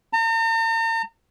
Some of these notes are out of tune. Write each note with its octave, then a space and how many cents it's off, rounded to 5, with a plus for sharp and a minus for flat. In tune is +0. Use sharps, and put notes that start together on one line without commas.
A#5 -45